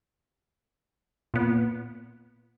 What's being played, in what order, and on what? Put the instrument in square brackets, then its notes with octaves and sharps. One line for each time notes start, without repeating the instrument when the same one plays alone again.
[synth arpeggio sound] A#2 B3